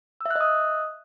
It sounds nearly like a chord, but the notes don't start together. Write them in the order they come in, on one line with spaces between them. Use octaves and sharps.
E6 E5 F#6 D#5 D#6